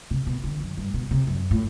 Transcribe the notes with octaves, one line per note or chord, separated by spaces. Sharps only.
C3
B2
D3
F#2
G2
B2
C3
F#2
A2